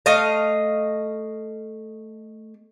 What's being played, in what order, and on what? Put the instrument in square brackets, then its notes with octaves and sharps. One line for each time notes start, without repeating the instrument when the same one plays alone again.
[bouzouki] A3 D#5 F5